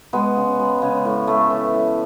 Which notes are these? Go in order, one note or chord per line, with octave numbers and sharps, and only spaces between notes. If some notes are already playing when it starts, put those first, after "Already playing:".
G#3 B3
C#3
G#3
C#3
A2
A3
E3
A2